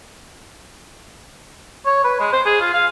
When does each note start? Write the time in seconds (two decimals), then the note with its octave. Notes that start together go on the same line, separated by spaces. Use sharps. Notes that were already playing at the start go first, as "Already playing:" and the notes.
1.86 C#5
2.04 B4
2.20 G#3
2.32 C5
2.46 G#4
2.61 F4
2.74 F5